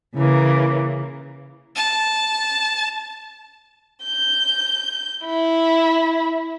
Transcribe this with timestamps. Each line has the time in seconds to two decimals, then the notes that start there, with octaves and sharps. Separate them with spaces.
0.16 C#3 E3 A#3
1.76 A5
4.04 G6
5.24 E4